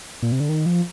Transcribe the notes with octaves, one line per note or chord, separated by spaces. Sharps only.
A#2
C3
D3
D#3
F3